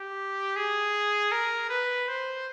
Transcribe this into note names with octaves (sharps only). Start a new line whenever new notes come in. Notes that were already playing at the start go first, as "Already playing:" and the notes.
Already playing: G4
G#4
A#4
B4
C5